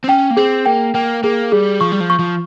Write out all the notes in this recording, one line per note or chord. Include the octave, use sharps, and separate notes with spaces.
C4
C#4 G5
A#3
C4 G#4
A#3 G5
A#3 G5
A#3 G#4
G3 G#4
F3 C#6
G3
F3
C#6
F3